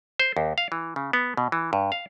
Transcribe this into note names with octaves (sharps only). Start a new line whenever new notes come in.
C5
D#2
F5
E3
C#3
B3
B2
E3
G2
F5